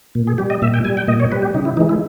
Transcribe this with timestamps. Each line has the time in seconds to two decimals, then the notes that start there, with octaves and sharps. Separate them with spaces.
0.15 A#2
0.27 G#4
0.38 G3 G4
0.50 D#5
0.62 A#2 E5
0.74 G5
0.84 G3 G#5
0.97 G5
1.08 A#2 D#5
1.20 C#5
1.32 G3 B4
1.42 G4
1.54 C#3 D#4
1.65 E4
1.77 E3 D#4
1.80 G#3
1.89 E4